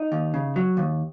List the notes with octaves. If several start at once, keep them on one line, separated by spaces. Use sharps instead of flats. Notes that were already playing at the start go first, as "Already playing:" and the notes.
Already playing: D#4
D#2
C#3
F#3
D#2